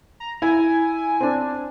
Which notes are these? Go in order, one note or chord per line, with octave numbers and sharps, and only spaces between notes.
A#5
E4 G#5
C4 D4